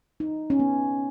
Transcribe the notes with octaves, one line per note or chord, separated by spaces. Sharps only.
D#4
C#4
B3